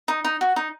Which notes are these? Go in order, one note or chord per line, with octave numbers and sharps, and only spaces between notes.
D#4
D#4
F#4
D#4